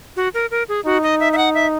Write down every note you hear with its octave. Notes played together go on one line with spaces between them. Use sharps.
F#4
A#4
A#4
G#4
D#4 F#4
D#5
E5
E5
F#5
E5